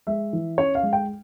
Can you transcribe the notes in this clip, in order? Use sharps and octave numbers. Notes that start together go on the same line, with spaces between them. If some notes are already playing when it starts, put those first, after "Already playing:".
G#3 E5
E3
C#4 C#5
F5
G#3
G5